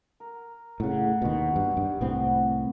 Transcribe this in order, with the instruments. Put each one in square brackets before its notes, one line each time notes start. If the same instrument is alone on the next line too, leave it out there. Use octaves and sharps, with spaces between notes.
[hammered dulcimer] A#4
[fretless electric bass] A2 C#3 [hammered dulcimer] F#5
[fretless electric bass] D#2 B2 [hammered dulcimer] D#3 B3 F#4
[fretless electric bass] G2
G2
[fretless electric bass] C2 A2 C4 [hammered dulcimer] B3 F#4